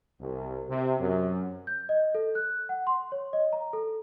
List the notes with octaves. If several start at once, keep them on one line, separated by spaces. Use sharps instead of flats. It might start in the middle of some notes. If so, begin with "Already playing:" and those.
C2
C3
F#2
G6
D#5
A4
F#6
F#5
C6
C#5
D#5
A#5
A4